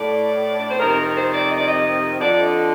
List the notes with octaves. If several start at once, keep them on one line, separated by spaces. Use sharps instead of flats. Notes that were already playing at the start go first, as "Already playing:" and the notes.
Already playing: A2 D5
D5
C5
F2 C3 D#3 A#4
A#4
C5
D5
D#5
D5
D#5
F2 D3 D5
D#5